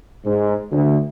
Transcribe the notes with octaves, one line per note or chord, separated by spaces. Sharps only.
G#2
D2